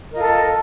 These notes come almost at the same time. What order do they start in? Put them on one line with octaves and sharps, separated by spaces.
A#4 D#5 F4 A4